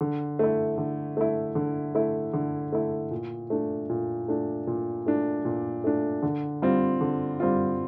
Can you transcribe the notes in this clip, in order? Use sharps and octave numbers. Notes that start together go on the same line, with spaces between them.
D3
A3 E4
D3
A3 E4
D3
A3 E4
D3
A3 E4
A#2
A3 D4
A#2
A3 D4
A#2
A3 D4
A#2
A3 D4
D3
G3 C4 F4
D3
G3 C4 F4